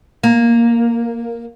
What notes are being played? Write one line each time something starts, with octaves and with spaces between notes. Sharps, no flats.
A#3